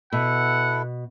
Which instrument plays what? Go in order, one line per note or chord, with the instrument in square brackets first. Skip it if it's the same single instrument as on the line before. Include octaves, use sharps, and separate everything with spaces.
[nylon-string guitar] B2 [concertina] E4 A4 [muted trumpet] F#5